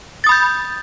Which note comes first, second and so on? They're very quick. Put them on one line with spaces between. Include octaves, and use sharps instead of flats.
A6 D#6 B5 G6